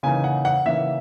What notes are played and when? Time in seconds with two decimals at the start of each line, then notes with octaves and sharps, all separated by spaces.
0.03 C#3 E3 A#3 D#4 G#5
0.24 F#5
0.45 F#5
0.65 C#3 E3 A#3 D#4 E5